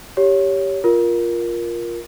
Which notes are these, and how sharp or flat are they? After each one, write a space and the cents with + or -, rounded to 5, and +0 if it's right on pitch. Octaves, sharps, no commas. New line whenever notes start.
G4 +0 C#5 +10
F4 +0 A#4 +10